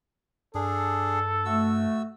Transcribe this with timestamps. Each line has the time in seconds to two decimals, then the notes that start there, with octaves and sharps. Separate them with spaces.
0.55 G2 D4 G#4 A4
1.45 A3 F#4 E6